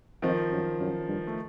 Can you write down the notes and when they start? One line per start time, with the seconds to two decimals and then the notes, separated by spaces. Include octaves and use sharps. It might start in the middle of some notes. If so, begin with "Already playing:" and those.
0.22 F2 D#3 F3
0.51 F#2
0.80 F#2
1.08 G2
1.27 A3